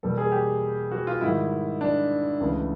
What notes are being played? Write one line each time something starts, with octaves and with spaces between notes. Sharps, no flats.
E2 B2 G3 A#3 A4
G#4
G4
F#4
F4
G#2 D#3 G3 E4
D4
C#2 C#3 E3 A3